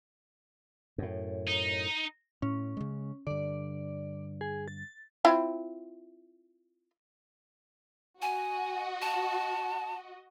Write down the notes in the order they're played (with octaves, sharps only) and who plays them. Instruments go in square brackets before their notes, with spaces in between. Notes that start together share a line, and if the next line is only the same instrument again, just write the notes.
[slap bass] F#2 A2
[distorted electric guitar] D#4
[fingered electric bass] A2 [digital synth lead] C#4
[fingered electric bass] C#3 G#3
[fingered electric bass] G2 D3 [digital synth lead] D5
[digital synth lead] G#4
A6
[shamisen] C4 E4 F4
[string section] F#4 D#5 [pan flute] G#5
[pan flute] A5